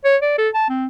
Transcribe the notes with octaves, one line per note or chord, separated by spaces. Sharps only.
C#5
D5
A4
A5
C4